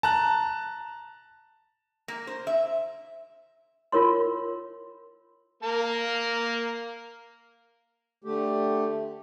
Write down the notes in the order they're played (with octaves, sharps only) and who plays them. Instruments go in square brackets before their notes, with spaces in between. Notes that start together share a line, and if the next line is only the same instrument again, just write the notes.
[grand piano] A5 A#5 F#6
[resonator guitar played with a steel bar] A#3
C5
E5
[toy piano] F4 A#4 C#5 C6
[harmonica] A#3 A#4
[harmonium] D3 A3 G4